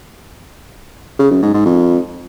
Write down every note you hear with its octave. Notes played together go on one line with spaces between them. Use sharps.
C#3
F#2
G#2
G#2
F2